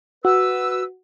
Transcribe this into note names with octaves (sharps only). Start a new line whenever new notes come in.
F#4 B4 E6